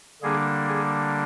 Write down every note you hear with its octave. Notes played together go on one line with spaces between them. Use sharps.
D3 G3 A#3 D4 G#4
G#4